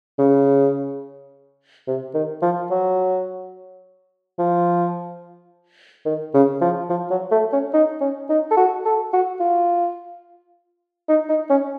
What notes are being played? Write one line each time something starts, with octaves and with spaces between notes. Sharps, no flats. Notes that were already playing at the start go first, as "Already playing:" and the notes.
C#3
C3
D#3
F3
F#3
F3
D#3
C#3
F3
F3
F#3
A3
C#4
D#4
C#4
D#4
A4
F#4
A4
F#4
F4
D#4
D#4
C#4